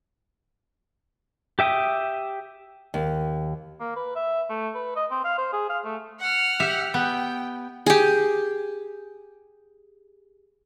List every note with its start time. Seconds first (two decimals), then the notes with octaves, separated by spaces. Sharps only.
1.59 G4 E5 G5 D#6
2.94 D#2
3.80 A#3
3.96 B4
4.16 E5
4.50 A3
4.75 B4
4.96 D#5
5.11 C4
5.25 F5
5.38 C5
5.53 G#4
5.70 F5
5.84 A3
6.20 F#5 F6
6.60 G4 E5
6.94 B3 G5
7.86 G4 G#4